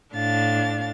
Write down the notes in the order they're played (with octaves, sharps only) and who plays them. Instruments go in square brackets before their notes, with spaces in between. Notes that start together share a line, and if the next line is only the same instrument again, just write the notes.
[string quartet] A2 D4 F5 A6